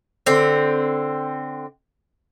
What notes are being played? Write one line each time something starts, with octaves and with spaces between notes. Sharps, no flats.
D3 C4